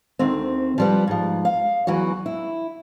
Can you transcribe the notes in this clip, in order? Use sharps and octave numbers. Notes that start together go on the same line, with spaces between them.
D2 D#3 C4
F3 G3 B4
G#2 F3
F5
E2 E3 F#3 F#4
E4